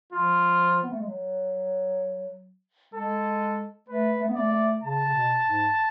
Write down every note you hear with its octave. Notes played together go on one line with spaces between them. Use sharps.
F3 F4
B3
A3
G#3
F#3
G#3 A4
A3 B4
A3
B3
A3 D5
A3
C#3 A5
C#3
B2
G#2